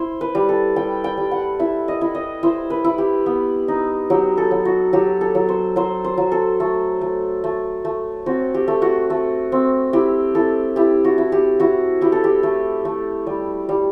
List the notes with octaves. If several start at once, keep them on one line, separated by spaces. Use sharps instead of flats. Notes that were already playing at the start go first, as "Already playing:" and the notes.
Already playing: E4 C5
B4
G3
A4
G3 G5
G5
G3
F#5
E4 E5
D#5
E4
D#5
E4 C5
B4
E4
G4
B3
D#4
F#3 G4
A4
F#3
F#4
F#3 G4
A4
F#3
C5
F#3 C5
C5
F#3
A4
A3
A3
A3
A3
C4 F#4
G4
A3
F#4
A3
C4
E4 G4
E4 A4
E4 G4
F#4
E4
G4
E4 F#4
E4 G4
A4
G4
A3
A3
G3
G3